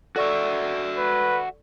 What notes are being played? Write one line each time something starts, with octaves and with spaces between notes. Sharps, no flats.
F#4 A4 D5 E5 C#6
B4